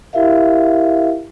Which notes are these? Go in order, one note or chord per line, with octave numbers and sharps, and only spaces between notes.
E4 G4 A#4 E5 F5